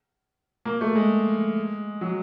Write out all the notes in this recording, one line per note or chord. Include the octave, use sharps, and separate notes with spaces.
A#3
A3
G#3
F#3